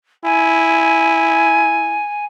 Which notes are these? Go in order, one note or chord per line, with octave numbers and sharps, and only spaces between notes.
E4 G#5